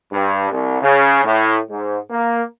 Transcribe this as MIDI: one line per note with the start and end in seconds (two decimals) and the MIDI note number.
0.12 0.51 43
0.51 0.80 36
0.82 1.22 49
1.25 1.58 45
1.70 1.98 44
2.10 2.43 58